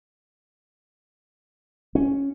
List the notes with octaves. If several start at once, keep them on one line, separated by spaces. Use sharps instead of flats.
C#4